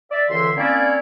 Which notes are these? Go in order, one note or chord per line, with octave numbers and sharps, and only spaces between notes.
D5 E5
C#2 D3 E3 E5 C6
A#3 C4 C#4 E4 C#5 D5